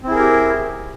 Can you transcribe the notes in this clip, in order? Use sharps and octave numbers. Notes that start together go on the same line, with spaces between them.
C4 E4 G4 G#4 A#4